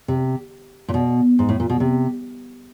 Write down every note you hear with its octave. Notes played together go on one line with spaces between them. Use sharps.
C3
A#2
B2
G#2
A2
A#2
B2
C3